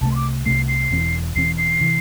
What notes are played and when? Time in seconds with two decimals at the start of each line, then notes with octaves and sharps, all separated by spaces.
0.01 C2 C3 A3 A5
0.12 C6
0.16 D6
0.46 C2 C3 A3 C7
0.68 C7
0.91 E1 E2 E3 C4
1.36 E1 E2 E3 C4 C7
1.58 C7
1.81 C3 E3